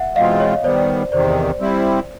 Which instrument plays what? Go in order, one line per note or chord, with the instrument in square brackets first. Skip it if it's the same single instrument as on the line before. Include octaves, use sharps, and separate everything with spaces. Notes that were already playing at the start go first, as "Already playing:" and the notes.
Already playing: [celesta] E5 F#5
[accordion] E2 B2 G#3 C4 F4 [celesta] D#5 F5
[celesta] C#5 D#5
[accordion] D#3 G3 B3 [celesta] C5 D5
[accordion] E2 C3 D#3 [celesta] C5 D5
[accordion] G3 C4 E4